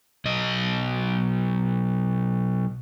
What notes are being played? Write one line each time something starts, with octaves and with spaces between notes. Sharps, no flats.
B1 D#5